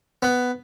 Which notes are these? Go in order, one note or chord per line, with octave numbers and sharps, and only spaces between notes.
B3